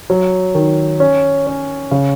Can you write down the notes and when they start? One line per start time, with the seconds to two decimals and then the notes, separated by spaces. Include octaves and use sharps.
0.10 F#3
0.55 D#3
1.00 C#4
1.47 C#4
1.91 C#3